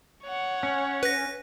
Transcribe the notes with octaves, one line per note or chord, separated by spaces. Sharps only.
C#5 F#5
C#4
B4 A#6